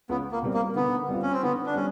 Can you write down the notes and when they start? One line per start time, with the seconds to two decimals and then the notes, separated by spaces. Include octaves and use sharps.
0.09 C#2 B3
0.32 A#3
0.42 B2 G3 C4
0.54 A#3
0.76 D3 B3
1.09 G3 C4 F4
1.23 C#4
1.32 C4
1.42 D3 B3
1.66 D4
1.76 G3 C#4